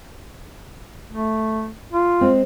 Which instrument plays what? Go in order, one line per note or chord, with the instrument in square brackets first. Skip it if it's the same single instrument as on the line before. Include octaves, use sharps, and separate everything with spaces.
[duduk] A3
F4
[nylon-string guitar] G#3 C4